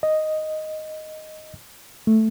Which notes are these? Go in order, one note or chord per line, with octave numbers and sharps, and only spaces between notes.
D#5
A3